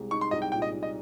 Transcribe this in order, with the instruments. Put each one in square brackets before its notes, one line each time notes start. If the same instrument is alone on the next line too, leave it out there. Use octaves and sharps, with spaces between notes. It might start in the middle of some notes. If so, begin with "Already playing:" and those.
Already playing: [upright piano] C2 G#3
[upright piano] D#4 [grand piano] C#6
[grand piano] C6
[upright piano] C2 [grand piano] D#5
[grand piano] G5
[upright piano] A#2 [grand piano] G5
[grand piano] D#5
[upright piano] A#2
[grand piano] D#5